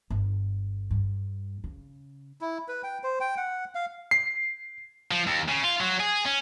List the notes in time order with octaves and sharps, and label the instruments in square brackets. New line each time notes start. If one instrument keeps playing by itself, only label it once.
[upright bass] G1
G2
C#3
[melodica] E4
B4
G5
C5
G5
F#5
F5
[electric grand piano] C7
[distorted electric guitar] F3
D#2
C#3
F4
F#3
G#4
C#4